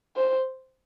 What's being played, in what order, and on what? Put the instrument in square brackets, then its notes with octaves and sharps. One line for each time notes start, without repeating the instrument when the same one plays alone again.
[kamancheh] C5